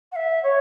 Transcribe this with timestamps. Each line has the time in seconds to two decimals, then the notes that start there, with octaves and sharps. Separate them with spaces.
0.12 F#5
0.16 E5
0.43 C#5